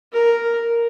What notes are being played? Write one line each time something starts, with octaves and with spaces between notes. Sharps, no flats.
A#4